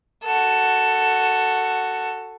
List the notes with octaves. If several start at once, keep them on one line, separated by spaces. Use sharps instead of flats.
F#4 A4